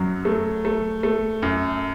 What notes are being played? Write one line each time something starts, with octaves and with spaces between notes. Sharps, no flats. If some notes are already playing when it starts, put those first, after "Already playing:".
Already playing: F#2 F#3
A3
A3
A3
F#2